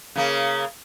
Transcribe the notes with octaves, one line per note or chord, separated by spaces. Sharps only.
C#3 A#3